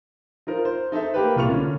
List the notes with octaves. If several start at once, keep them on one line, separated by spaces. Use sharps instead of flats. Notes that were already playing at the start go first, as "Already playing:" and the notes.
D#4 F4 A#4 C5
C5
D#4 A4 C5 E5
A#3 G4 B4
C2 A#2 F4 C#6 F7
D3 C#4